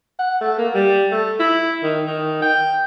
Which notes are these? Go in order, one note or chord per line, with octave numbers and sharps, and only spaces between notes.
F#5
A3
A#3
G3
A3
E4
D#3
D#3
G5